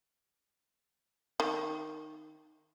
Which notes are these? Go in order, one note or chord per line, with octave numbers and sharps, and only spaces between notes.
D#3